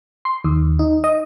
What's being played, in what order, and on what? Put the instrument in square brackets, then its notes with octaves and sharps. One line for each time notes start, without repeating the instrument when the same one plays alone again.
[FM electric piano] C6
D#2
D#4
D#5